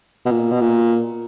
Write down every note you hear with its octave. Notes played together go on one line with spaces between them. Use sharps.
B2
A#2
B2
A#2